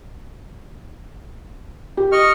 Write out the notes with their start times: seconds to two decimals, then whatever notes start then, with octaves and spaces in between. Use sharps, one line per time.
1.97 G4
2.12 D#5 C#6 F6